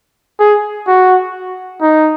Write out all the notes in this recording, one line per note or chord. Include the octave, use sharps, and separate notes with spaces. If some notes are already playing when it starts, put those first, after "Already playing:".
G#4
F#4
D#4